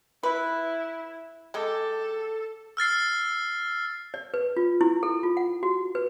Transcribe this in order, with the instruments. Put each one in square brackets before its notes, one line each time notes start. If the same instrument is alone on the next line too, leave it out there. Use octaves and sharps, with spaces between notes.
[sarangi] E4 [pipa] B4
[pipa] G#3 G4 [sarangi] A4
[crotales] E6 F6 A6 C7
[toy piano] D5
B4
F4
E4
A4
F4
F#5
F#4
B4